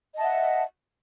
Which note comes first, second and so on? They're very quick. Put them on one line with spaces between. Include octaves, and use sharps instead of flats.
D#5 A5 E5 F#5